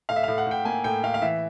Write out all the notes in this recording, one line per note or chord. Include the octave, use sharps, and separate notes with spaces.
A2 F5
E5
A2 F5
F#5
A2 G5
A#3 G#5
A2 G5
A2 F5
F5
E3 E5